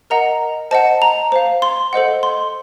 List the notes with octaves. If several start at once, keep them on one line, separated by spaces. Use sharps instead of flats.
A#4 D#5 F#5 A#5
C5 D#5 F#5 A5
A#5
C5 F5
C6
A4 C5 D#5 F#5
C6